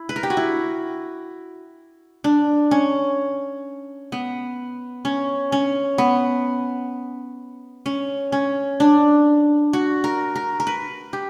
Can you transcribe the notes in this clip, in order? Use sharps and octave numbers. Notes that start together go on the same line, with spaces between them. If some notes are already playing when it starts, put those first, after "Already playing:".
Already playing: E4
B4
A#4
G4
F#4
E4
D4
C#4
B3
C#4
C#4
B3
C#4
C#4
D4
F#4
A#4
A#4
A#4
B4
G4